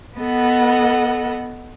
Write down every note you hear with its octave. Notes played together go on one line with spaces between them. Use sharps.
B3 A4 D#5 F#5